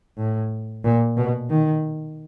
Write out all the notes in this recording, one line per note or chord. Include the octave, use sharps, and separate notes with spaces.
A2
A#2
B2
D#3